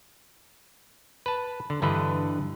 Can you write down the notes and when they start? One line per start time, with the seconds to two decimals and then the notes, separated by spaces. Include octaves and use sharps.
1.26 B4 A5
1.70 D3
1.82 G2 D3 E3 B4 D#5